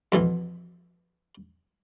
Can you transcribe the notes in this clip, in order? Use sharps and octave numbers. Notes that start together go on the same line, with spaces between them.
F2 B2 E3